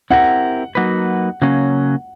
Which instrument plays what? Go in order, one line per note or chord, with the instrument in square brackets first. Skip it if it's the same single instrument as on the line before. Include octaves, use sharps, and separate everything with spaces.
[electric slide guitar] C4 E4 G4 A#4 [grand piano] F#5
[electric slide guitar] F#3 A#3 D#4 F#4 B4
C#3 F#3 A#3 C#4